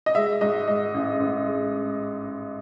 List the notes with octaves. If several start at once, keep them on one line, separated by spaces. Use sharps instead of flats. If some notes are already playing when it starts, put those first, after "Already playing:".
D#5
G#3 E5
G#2 D#5
G#3 D#5
A1
A1
G#3